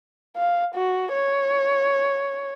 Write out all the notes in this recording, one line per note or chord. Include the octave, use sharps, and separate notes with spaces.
F5
F#4
C#5